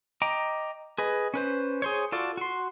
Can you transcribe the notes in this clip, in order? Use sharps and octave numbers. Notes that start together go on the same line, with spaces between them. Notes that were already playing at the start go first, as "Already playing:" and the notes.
D#5 G5 A#5 D6
G#4 B4 D#5
C#4 B4 C5
G#4 C5 C#5
F4 F#4 A4 D5
F#4 C6